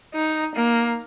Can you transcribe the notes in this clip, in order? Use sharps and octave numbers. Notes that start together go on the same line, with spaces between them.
D#4
A#3